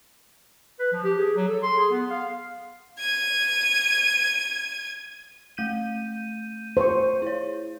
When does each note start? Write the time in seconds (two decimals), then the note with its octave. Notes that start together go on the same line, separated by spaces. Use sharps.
0.79 B4
0.93 F3
1.04 G4
1.18 G#4
1.36 F#3
1.48 A4
1.63 C6
1.78 G#4
1.91 B3
2.10 F5
3.00 G#6 D#7
5.57 A3 G6 D#7
6.77 C5 C#6
7.22 E4 C#5